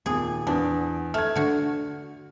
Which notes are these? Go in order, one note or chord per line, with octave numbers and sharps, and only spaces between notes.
D#2 A#2 G#4
E2 D4
A3 F6 G#6
D3 F#4